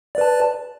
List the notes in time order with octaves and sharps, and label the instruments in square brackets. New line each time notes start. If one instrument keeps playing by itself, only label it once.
[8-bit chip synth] D5
B4
A5